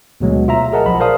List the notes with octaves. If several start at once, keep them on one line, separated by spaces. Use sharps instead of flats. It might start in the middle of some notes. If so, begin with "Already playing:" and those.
D2 B2 F#3 G#3
F4 E5 A#5
G#4 A#4 D#5 F#5 A5
B1 F3 B5
A#4 C5 D5 F5 A5 D#6